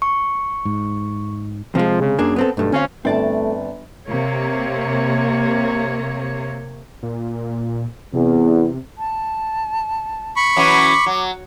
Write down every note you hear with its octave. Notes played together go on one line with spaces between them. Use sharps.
C#6
G#2
C3 F3 G#3
C#3
F#2 A#3 D4 G#4
B3 C4 A4
B1 G2 A3
D2 C4 C#4 F5
G1 A3 C4 D5 A5
C3 A#3 C#5
A#2
E2 C3
A5
B5 C#6
E3 F#3 C#4 D6
F#3